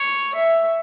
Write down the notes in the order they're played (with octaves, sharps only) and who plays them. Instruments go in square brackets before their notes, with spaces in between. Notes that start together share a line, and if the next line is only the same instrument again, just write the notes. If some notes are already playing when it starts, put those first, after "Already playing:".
Already playing: [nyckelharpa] C#5
E5